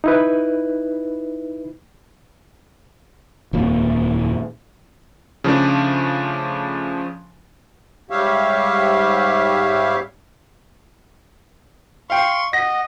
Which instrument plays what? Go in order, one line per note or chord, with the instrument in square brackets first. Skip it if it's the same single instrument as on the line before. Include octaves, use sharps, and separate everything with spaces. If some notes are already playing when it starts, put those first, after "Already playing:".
[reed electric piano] D#4 E4 B4
[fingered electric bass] D#1 F2 F3 A#3
[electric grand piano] C#3 F3 A3 D4
[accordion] G#2 G3 G4 C#5 E5 F5
[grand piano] F5 G5 [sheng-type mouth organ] C6 C#6
[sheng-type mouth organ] D#5 [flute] F#5 [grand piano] A#6